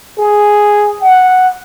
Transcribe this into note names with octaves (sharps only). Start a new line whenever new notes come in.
G#4
F#5